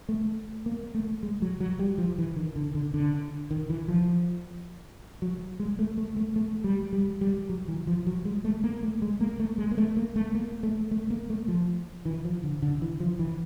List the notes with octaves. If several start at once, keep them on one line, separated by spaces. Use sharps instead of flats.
A3
A#3
A3
G#3
F#3
F#3
G3
F3
E3
D#3
D3
D3
D3
D#3
E3
F3
F#3
G#3
A3
A3
A3
A3
G3
G3
G3
F#3
E3
F3
F#3
G#3
A3
A#3
A3
G#3
A#3
A3
G#3
A#3
A3
A#3
A3
A#3
A3
A3
A#3
A3
F3
E3
F3
D3
D3
E3
F3
E3